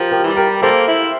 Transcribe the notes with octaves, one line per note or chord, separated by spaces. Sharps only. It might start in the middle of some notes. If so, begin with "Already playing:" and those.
Already playing: F3 G4 A#4
G4 A#4
E3 G3
G4 A#4
G3 A#3 A4 C5
E4